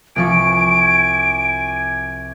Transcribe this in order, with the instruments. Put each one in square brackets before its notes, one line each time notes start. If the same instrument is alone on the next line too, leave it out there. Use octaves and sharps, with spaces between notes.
[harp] C2 F3 C#6 [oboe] G#5 [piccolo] D7